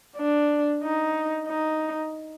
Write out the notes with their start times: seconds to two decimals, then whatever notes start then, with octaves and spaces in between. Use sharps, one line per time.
0.17 D4
0.83 D#4
1.47 D#4